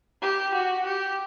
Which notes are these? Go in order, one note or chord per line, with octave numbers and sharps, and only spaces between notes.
G4
F#4
G4